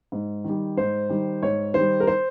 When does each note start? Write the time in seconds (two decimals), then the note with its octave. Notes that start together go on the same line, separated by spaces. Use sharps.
0.12 G#2
0.44 D#3 G3
0.77 G#2 C5
1.09 D#3 G3
1.42 G#2 C#5
1.74 D#3 G3 C5
2.00 A#4
2.07 C5